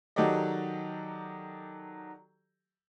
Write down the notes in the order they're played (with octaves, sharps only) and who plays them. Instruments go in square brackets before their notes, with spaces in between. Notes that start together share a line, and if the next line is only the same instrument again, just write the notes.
[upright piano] D#3 F#3 G4 A4 D5 D#5